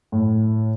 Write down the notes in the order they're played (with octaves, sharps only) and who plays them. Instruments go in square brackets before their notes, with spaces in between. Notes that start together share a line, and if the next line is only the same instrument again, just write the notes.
[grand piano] A2